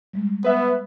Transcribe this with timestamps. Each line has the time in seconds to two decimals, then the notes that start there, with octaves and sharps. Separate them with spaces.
0.13 G3 G#3
0.44 B3 B4 E5